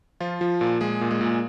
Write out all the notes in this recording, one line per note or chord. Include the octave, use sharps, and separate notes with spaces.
F3 F4
F3
A#2
A#2 G#3 G#4
A#2
G#3 G#4
A#2